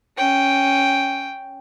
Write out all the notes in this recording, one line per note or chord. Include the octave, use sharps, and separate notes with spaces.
C#4 G5